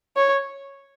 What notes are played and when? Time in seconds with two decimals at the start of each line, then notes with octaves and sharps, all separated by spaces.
0.16 C#5